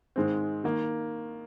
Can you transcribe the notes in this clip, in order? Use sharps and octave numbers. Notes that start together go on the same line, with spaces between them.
G#2 D#3 G#3 C4
D#3 A#3